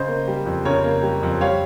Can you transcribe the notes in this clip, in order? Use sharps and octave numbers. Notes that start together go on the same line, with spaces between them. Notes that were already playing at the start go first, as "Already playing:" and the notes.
Already playing: C#3 C5 D#5
A#3
G3
F2
C#3 A#4 C#5
A#3
G3
F2
G3 C#5 F5